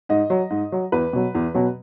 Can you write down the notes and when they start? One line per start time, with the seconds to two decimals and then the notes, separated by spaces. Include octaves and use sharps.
0.09 G#2 D#5
0.30 F#3
0.50 G#2
0.72 F#3
0.92 E2 B4
1.13 B2 F#3
1.35 E2
1.55 B2 F#3